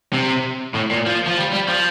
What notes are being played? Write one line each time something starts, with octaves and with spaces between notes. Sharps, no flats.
C3
A2
A#2
F3
F3
G3
G3
F3